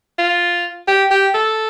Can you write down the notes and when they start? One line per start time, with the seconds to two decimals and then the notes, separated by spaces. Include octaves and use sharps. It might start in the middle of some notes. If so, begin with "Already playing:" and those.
0.18 F4
0.88 G4
1.11 G4
1.35 A4